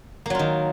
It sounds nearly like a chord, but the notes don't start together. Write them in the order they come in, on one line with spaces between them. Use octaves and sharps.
A#3 F#3 F4 D#3